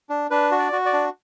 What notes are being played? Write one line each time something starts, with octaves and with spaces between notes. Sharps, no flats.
D4
D4 B4
F#4
D5
F#4
D5
D4